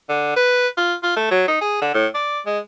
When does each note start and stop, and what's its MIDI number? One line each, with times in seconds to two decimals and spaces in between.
0.09 0.36 50
0.36 0.68 71
0.77 0.94 65
1.03 1.16 65
1.16 1.28 57
1.31 1.43 54
1.48 1.60 63
1.61 1.77 68
1.82 1.90 50
1.94 2.06 45
2.14 2.40 74
2.46 2.58 56